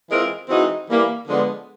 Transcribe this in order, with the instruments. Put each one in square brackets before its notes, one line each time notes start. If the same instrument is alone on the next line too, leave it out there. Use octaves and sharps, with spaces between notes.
[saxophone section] E3 G#3 C4 F4 A#4
E3 G#3 C4 D#4 F#4
E3 G3 A#3
D3 F3 G#3 B3 D4